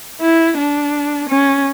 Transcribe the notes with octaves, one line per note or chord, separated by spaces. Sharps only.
E4
D4
C#4